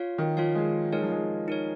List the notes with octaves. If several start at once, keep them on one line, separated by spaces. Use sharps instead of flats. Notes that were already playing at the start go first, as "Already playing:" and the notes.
Already playing: F4 C#5 F5
D#3
F3 F4 C#5 F5
G#3
G#3 D#4 A#4 C#5
F3
G#3
D#4 A#4 C#5